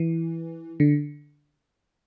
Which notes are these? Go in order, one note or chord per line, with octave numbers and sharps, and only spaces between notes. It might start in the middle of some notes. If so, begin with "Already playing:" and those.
Already playing: E3
D3